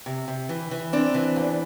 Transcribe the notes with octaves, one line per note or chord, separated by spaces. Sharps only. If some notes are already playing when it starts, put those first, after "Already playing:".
C3
C3
E3
E3
C4 D4
E3
E2